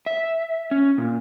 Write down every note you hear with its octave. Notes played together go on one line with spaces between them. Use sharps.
E5
C#4
A#2